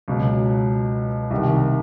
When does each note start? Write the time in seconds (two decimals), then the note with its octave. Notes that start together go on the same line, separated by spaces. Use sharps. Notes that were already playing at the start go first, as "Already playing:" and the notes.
0.08 C#2 B2 F#3
1.31 C2 C3 D#3